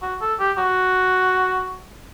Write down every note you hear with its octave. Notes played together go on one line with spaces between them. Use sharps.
F#4
A4
G4
F#4